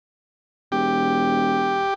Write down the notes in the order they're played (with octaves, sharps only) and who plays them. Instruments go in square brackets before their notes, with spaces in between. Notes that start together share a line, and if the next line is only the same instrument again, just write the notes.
[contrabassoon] E1 [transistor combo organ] G4